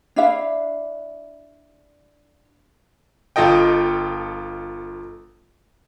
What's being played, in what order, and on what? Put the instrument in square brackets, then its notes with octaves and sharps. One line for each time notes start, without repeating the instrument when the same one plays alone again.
[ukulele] D4 E4 E5 F5
[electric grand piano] G1 F4 A4 D#5 G5